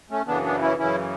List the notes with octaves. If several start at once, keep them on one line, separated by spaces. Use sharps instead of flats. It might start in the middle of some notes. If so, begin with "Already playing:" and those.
A3 C#4
F#2 C#3 E3 B3 D4
B3 D4
C#4 E4
F#2 C#3 E3 C#4 E4